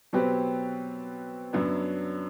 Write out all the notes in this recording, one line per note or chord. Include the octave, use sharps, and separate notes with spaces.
B2 F#3 C4 G4 B4
F#2 F#3 B3 D4